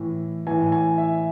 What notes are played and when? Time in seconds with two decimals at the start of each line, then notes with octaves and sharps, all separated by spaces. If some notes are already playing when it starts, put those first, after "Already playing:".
Already playing: A2 E3
0.47 A2 E3 G#5
0.72 G#5
0.98 E5